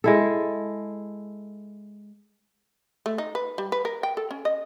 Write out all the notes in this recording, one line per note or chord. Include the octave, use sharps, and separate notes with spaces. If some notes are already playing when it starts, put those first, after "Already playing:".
G#3 E4 A4
A3
D#4
B4
G3
B4
A#4
G5
A4
C#4
D#5